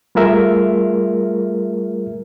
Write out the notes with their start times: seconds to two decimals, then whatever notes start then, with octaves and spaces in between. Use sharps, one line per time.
0.15 G3 A3 F4 G#4 A#4 E5